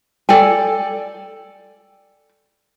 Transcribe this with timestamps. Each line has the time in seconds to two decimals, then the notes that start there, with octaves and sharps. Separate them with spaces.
0.29 A4 D5 G5 G#5